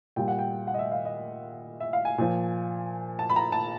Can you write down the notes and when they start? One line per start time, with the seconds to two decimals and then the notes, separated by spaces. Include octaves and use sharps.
0.16 A#2 G3 G5
0.28 F#5
0.39 G5
0.67 F#5
0.74 D#5
0.79 E5
0.92 F5
1.05 D#5
1.80 E5
1.93 F5
2.05 G#5
2.18 A#2 F3
3.19 A5
3.30 B5
3.36 A#5
3.52 A5